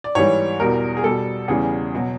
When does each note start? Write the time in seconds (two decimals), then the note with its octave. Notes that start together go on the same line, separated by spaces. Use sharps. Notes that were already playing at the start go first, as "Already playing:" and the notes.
0.04 D5
0.15 G#2 E3 G3 C#5
0.60 E2 B2 G3 A#4
0.97 G#4
1.04 B2 G3 A4
1.48 E2 C#3 E3 G3 G#4
1.95 B2 F#3